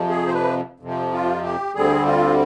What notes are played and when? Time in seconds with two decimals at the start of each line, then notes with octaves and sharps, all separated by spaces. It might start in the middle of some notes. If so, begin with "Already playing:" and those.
Already playing: F2 C3 F3
0.09 G#4
0.28 C5
0.33 B4
0.80 F2 C3 F3
1.12 F4
1.44 G4
1.75 D2 D3 G3 C4 G#4
2.06 F4